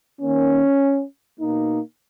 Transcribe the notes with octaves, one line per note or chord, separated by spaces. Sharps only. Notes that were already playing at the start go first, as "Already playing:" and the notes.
D#3 A#3 C#4
B2 A#3 D#4